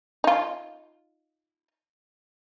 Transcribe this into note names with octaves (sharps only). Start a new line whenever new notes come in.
D#4 F4